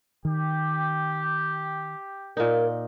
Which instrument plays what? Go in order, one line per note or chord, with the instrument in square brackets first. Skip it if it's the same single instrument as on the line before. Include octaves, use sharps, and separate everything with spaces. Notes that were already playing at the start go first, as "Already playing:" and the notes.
[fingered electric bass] D#3 [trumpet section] G4
[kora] A#2 D#4 [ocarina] A#4